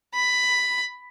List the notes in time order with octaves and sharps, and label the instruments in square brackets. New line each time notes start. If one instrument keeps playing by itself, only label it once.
[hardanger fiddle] B5